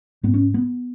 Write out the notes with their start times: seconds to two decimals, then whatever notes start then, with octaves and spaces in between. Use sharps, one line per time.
0.23 G#2 B3
0.34 C#4
0.54 B3